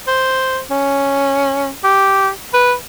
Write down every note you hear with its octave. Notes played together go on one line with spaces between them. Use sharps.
C5
C#4
G4
B4